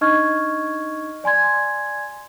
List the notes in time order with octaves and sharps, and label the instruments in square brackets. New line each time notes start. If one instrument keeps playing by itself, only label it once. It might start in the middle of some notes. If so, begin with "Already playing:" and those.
[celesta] D4 D#4 D#5 C#6 F6 G#6
D5 G#5 C6 G#6